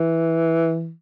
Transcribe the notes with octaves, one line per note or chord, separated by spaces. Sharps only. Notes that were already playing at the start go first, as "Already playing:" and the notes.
Already playing: E3